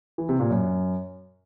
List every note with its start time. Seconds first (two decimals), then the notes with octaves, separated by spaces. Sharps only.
0.18 E3
0.29 C3
0.40 A#2
0.50 F#2